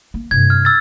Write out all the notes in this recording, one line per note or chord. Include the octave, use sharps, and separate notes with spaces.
A#3
G2 C3 G#6
F6
E6 A6